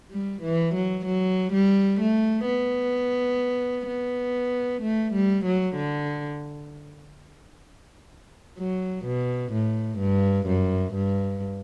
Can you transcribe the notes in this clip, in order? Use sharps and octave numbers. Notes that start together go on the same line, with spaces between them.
G3
E3
F#3
F#3
G3
A3
B3
B3
A3
G3
F#3
D3
F#3
B2
A2
G2
F#2
G2